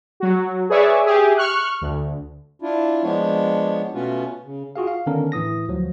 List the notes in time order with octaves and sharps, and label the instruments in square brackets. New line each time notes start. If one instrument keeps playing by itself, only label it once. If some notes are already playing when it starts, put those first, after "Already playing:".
[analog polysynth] F#3 F#4
G#4 B4 C#5 D5 E5 C#6
G4 G#4 E5
C#6 F6 F#6
D2
[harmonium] D4 E4 F4
F3 G#3 B3 D4 C#5
B2 A3 B3 C#4 F4 F#4
C#3
[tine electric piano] F4 F#4 G#4 F5
F5
D3 D#3 B3 C#4 D4 A#4
A2 E3 D#6 A#6
D2 F3 F#3